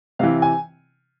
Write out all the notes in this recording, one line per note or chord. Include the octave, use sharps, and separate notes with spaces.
C3 E3 F5
G#5